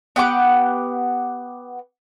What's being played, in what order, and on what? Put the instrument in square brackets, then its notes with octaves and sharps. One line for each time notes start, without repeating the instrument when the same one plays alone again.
[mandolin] B3 G4 F#5 D6